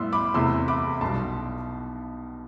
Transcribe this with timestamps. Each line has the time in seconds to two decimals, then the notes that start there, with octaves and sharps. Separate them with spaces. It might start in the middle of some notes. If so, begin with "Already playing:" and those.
Already playing: A2 G3 B3 E4 C6 E6
0.13 B5 D6
0.34 E2 C3 E3 A3 C6 E6
0.68 B5 D6
1.01 B1 B2 G3 A5 C6